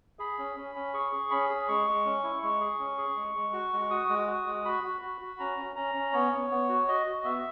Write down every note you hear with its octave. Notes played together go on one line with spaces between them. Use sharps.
G#4 B5
C#4
C#4
C#4
G#4 C#6
G#4
C#4 B5
G#4
G#3 C#6
G#3
C#4
E4
G#3 C#6
G#4
C#4
G#4
G#3
G#3
F#4
G#3
F#4 D#6
G#3
F#4
G#3
F#4 B5
F#4
F#4
F#4
C#4 A#5
C#4
C#4 A#5
C#4
B3 C#5
B3
B3
F#4
F#4 D#5
F#4
B3 E5